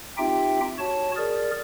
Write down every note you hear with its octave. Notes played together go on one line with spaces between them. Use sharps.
C4 D#4 F4 G4 E5 G5
F#4 C#5 A5
G#4 A#4 D5